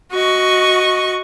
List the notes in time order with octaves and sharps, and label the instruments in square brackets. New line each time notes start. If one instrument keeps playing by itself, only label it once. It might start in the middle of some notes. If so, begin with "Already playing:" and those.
[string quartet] F#4 D#5 C#6